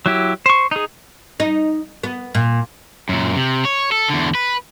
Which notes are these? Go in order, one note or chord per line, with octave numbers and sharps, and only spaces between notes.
F#3 E4 G4
C5 C#6
D#4 G#4
D#4
B3
A#2
F#2 A#2
C3
C#5
A4
E2 D3
B4